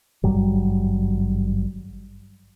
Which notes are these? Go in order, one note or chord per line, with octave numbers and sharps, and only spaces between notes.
G#1 G2 F#3 G3